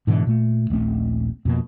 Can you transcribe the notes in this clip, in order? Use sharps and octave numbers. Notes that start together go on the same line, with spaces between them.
G#2 B2 D3 E3
A#2 A3
D#1 A#1 A3 C4
F2 B2 A#3